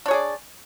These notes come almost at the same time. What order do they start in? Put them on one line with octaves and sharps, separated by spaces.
D4 C#5 G#4 D5